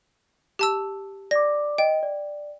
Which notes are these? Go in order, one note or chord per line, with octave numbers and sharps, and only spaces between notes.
G4 A5 E6
D5 D6 A#6
D#5 G5
D5